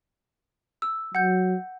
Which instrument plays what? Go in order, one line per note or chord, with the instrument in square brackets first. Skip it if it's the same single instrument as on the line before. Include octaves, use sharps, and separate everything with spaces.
[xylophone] E6
[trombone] F#3 [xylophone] F#5 G6